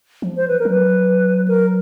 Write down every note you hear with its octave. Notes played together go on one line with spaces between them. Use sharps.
F3
C5
B4
A#4
F#3
B4
A#4